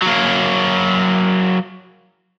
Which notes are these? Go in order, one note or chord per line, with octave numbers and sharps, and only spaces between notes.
F#3 A#3